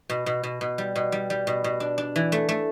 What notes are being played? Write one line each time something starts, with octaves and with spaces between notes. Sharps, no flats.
B2
B2
B2
B2
G3
B2
G3
G3
B2
B2
D4
D4
E3
A3
A3